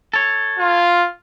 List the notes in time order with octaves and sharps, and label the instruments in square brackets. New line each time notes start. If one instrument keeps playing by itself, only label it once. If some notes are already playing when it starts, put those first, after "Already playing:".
[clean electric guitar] A4 C#5
[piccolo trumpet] F4